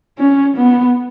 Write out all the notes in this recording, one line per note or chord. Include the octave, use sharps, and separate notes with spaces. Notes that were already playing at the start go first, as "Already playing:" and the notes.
C#4
B3